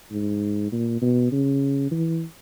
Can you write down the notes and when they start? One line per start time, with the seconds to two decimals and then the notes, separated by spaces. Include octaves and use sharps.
0.11 G#2
0.72 A#2
1.02 B2
1.32 C#3
1.91 E3